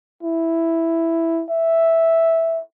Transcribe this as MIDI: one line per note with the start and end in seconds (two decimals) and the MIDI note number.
0.23 1.44 64
1.50 2.61 76